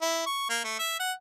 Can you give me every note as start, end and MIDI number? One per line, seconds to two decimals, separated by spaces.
0.02 0.23 64
0.26 0.46 85
0.50 0.59 58
0.64 0.75 57
0.79 0.98 76
1.00 1.12 78